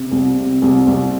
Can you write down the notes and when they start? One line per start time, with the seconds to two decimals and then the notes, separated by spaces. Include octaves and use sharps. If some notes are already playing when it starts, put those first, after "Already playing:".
Already playing: C3
0.12 C2
0.37 C3
0.62 C2
0.87 C2